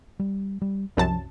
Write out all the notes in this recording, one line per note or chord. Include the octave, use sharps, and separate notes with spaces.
G3
G3
C2 F#2 F3 A5